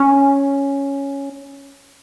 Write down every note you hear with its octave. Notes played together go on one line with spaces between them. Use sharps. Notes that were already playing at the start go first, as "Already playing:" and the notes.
Already playing: C#4